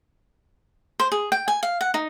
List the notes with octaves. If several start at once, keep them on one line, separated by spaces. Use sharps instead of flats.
C5
G#4
G5
G#5
F5
F#5
D#4